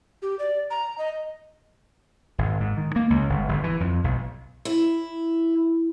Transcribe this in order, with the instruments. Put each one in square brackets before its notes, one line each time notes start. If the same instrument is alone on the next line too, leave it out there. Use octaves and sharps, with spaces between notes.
[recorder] G4
D5
A#5
D#5
[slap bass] G#1
G#2
D#3
A#3
C#2
G1
G1
E3
F2
B1
[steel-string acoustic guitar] E4